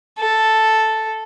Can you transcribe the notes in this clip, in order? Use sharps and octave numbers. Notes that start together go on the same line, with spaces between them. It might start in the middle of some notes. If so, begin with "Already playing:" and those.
A4